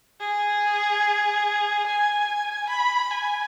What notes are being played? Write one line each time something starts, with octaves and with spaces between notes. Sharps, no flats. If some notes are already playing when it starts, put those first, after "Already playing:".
G#4
G#5
B5
G#5